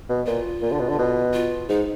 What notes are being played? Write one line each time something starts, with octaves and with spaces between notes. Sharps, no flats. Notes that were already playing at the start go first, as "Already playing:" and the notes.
B2
A#2 F4
A#2
D3
B2
D3
B2
F4
G#2 D#4